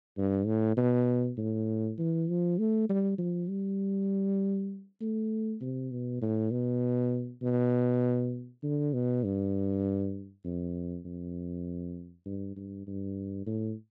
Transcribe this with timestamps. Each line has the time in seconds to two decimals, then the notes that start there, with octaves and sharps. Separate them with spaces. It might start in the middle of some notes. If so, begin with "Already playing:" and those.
0.17 G2
0.47 A2
0.77 B2
1.38 A2
1.98 E3
2.29 F3
2.59 A3
2.89 G3
3.19 F3
3.49 G3
5.01 A3
5.61 C3
5.91 B2
6.22 A2
6.51 B2
7.42 B2
8.63 D3
8.93 B2
9.24 G2
10.44 F2
11.05 F2
12.26 G2
12.56 G2
12.87 G2
13.46 A2